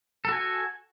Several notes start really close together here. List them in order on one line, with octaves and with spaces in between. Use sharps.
A4 F#4 G#5